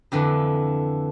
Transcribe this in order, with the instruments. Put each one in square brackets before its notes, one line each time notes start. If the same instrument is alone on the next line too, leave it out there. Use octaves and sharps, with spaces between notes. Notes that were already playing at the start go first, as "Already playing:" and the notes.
[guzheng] F2 D3 E3